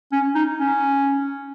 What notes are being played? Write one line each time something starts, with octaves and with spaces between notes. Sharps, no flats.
C#4
D#4
C#4